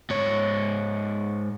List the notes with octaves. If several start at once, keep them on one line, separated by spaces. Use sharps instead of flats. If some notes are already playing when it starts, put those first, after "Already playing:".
G#2 C#5